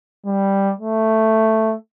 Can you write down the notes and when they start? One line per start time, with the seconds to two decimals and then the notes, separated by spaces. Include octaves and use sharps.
0.26 G3
0.79 A3